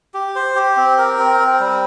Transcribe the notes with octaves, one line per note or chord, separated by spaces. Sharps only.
G4
C5
G4
C4
A#4
C4
C4
G3